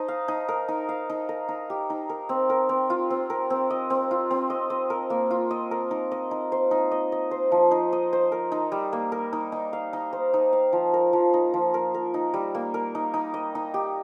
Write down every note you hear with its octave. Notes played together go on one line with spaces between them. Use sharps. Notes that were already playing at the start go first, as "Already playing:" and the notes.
Already playing: D#4 C5 D#5
F5
D#4
A#4
D#4
F5
D#4
A#4
D#4
G4
D#4
A#4
C4
A#4
C4
F4
C4
A#4
C4
D#5
C4
F4
C4
D#5
D#5
A#4
A#3
F4
D#5
A#4
D#4
D#5
D#4
C5
D#4
D#5
D#5
C5
F3
D#4
D#5
C5
A#4
D#4
G3
A#3
A#4
D#4
D#4
F5
D#4
C5
D#4
F5
F3
A#4
F3
D#4
F3
A#4
A#4
D#4
G3
A#3
A#4
D#4
D#4
D#5
D#4
G4